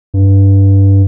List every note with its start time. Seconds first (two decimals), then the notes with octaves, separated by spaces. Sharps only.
0.14 G2